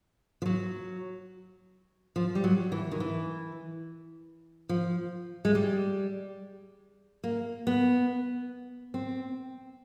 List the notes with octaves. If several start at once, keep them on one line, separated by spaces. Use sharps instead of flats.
F3
F#3
F3
G3
F#3
E3
D#3
E3
F3
G#3
G3
A#3
B3
C4